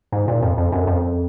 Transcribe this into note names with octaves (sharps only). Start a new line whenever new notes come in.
G#2
A#2
F2
F2
F#2
F2